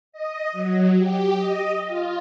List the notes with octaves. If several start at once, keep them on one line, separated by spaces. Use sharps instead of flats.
D#5
F#3
G4
D#5
F4